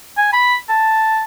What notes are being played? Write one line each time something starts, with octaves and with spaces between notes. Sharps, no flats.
G#5
B5
A5